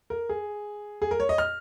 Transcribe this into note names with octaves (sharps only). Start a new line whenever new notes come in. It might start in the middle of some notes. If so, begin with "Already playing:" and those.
A#4
G#4
G#4
A#4
C#5
D#5
F6